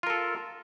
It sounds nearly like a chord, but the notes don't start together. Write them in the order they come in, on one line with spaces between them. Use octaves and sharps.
F4 A#4 A4